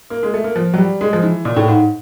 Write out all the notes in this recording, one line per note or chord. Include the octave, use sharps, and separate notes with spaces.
A#3
G#3
A3
A#3
F3
F#3
G3
G#3
F3
E3
A#2
A2
G#2